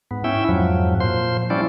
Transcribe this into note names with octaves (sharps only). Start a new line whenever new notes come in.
G#2 B3
C#4 E4 E5 G5
F2 G#2 F3 F#3
A#2 F3 C5 C6
F3 G3 C#4 E4 D5